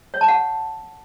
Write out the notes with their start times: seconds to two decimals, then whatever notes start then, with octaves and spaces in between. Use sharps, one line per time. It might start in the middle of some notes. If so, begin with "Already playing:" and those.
0.14 C#5
0.21 A5
0.28 F#5